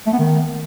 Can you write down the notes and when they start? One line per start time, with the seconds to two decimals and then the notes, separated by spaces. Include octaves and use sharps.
0.07 A3
0.13 B3
0.19 D#3